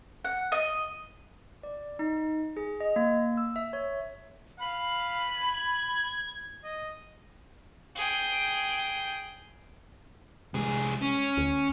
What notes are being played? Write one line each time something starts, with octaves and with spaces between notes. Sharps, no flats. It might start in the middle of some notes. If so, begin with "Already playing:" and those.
F#5
D#5
D5
D#4
G#4
D#5
A#3
E6
E5
C#5
F5 B5
G#6
D#5
G#4 G5
C2 G#3 G#4
C#4
D2